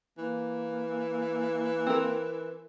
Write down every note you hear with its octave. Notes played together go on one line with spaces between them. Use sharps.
E3 A#3
C4 A#4